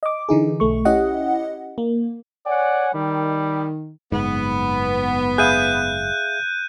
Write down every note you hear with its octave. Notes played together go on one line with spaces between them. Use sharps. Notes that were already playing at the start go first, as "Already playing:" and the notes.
D#5 D6
D3 E3 D#4 G#4
B1 A3 C#6
C#4 E4 G4 D#5 F#5
A#3
C#5 D5 F#5 G#5
D#3 G3
F#1 G#2 B3
G#4 E5 F5 F#6 G6 D#7